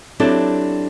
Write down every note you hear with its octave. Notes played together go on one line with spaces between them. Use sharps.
F#3 C4 D4 E4 G4 A4